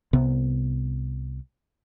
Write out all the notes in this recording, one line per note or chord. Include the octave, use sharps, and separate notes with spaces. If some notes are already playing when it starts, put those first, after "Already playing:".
C2 C3 B3